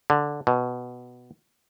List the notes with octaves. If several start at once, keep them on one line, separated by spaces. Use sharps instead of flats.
D3
B2